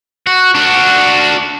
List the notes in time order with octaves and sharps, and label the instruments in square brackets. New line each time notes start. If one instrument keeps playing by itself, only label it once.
[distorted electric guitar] F#4
D4 F#4